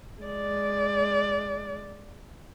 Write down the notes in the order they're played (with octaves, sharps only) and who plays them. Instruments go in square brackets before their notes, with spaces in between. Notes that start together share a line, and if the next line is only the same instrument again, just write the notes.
[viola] G#3 D5